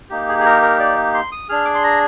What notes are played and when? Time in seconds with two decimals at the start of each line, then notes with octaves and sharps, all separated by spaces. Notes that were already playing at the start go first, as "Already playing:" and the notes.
0.10 A#3 D#4 G4
0.28 G#4
0.39 G#4
0.45 A#4
0.62 A#4
0.79 D5
1.14 C6
1.32 D#6
1.49 D4 G#4 F6
1.65 D6
1.75 C6
1.84 A#5